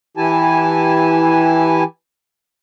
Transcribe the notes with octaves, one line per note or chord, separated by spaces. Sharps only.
E3 E4 G4 G#5 A5